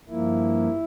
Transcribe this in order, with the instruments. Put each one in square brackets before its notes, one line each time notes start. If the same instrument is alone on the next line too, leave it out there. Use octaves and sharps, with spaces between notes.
[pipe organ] G2 F3 A#3 E4